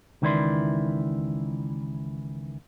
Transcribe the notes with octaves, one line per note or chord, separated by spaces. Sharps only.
C#2 D#3 E3 E4 D5 C6